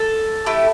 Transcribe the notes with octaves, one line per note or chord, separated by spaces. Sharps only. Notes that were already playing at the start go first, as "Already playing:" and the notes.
Already playing: A4
A3 E4 G4